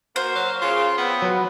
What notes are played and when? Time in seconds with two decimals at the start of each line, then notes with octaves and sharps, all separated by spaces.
0.16 A#3 F#4 C5
0.36 F#3
0.62 C#3 F4
0.98 B3 C4
1.22 F3 F#3 B4